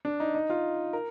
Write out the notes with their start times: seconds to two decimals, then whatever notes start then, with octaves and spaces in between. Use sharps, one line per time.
0.05 D4
0.20 D#4
0.34 D#4
0.50 F4
0.93 A#4